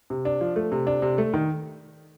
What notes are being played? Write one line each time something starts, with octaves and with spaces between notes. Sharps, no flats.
C3
D4
F3
A3
C3
D4
C3
A3
D#3